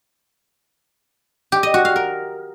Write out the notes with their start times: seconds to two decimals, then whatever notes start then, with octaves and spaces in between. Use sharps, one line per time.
1.52 G4
1.63 D#5
1.74 F#4
1.85 F5
1.96 A#4